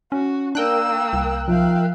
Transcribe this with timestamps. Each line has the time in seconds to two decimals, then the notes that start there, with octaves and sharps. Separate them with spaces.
0.12 C#4 F#4
0.55 A#3 D4 A#4 G5 E6 F#6
1.13 C2
1.48 F3 E5 F5